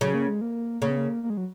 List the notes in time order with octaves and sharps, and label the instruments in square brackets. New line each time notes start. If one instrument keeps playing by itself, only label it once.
[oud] C#3 [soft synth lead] F#3
[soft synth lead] A#3
G#3
A#3
[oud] C#3 [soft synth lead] A#3
[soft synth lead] B3
A#3
A#3
G#3
F#3